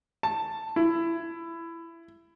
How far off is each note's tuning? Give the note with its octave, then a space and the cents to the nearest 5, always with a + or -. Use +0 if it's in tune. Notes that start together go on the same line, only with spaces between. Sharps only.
A5 +5
E4 +20